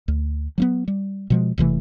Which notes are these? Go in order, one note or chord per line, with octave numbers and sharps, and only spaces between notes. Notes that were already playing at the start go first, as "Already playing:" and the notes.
D2
F#3 A#3 B3
G3
B2 F3 G#3
E1 C3 E3 A3